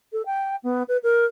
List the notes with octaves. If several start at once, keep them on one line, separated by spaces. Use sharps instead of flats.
A4
G5
B3
B4
A#4